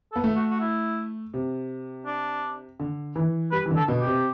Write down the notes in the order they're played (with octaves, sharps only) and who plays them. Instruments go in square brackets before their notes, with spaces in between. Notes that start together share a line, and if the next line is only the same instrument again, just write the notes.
[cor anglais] A4
[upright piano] B3
A3
[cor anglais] F#4
F#4
E4
[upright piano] C3
[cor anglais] D4
[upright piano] D3
E3
[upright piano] G3 [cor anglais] B4
[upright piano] E3
D3
[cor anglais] A4
[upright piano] B2
[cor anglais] G4
[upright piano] C3